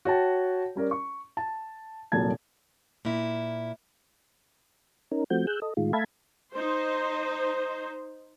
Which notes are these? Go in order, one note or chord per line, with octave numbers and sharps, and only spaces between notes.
F#4 C#5 G5 A5
G3 C#4 A#4 D5
C#6
A5
D#1 C2 A#2 F#3 A5 G#6
A#2 E4
C#4 D#4 A#4
F3 A3 C4 F#4 G6
G#4 E6 F#6 G6
A4 D#5
A2 D#3 G#3 F4
A3 E5 F5 A5 B5 G#6
D#4 C5